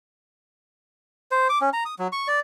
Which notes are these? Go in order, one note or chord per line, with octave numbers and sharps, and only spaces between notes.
C5
D6
C#4
A#5
D#6
F#3
C#6
D5